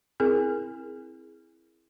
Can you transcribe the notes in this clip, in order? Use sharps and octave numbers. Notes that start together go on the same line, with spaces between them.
C4 E4 G#4 A#4